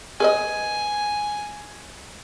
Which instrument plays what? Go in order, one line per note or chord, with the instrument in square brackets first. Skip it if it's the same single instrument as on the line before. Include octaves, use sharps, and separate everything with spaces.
[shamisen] G#4 B4 D#5 [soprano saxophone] G#5